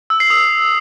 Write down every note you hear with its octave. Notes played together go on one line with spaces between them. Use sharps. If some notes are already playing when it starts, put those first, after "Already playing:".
E6
C7
D#6